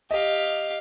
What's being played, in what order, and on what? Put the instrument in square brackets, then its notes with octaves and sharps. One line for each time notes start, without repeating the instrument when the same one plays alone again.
[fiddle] G4 F5 [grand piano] D#5